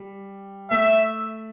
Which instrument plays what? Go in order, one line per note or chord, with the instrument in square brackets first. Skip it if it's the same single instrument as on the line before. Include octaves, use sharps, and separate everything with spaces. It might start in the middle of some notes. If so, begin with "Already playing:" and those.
Already playing: [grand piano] G3
[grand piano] A3 [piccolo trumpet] E5